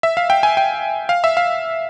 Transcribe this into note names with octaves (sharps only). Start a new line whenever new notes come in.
E5
F5
G5
G#5
G5
F5
E5
F5